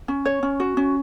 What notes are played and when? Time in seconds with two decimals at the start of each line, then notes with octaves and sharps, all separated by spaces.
0.08 C#4
0.25 C#5
0.43 C#4
0.60 F#4
0.77 C#4